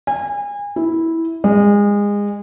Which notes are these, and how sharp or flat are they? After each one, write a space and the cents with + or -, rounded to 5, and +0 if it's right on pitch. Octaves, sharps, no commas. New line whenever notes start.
G#5 -30
E4 -10
G#3 -25